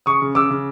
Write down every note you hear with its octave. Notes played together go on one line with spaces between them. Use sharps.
C#3 C#6 D#6
C#3
C#3 D6 E6
C#3